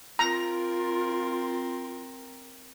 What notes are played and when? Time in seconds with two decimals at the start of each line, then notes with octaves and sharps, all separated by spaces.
0.19 C4 F4 A#4 A#5